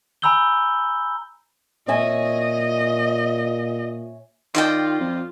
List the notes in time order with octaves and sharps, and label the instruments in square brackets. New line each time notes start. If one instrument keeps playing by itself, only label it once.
[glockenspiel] G#5 A#5 B5 E6 G6 G7
[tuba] A#2 [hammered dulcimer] C#5 E5 G#5 [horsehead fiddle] D#5
[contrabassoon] D#3 [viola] F4 [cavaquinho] D5 D#5 G5
[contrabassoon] F2